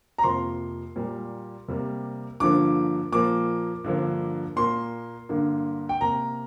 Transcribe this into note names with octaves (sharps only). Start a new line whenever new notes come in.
A#5
F2 C3 F3 A#3 C6
A#2 G3 A#3
C3 G3 A#3
G2 D3 F3 A#3 D6
A#2 F3 A#3 D6
G2 D3 F3 A#3
A#2 A#3 C6
G2 D3 A#3
G5
C3 A#3 A#5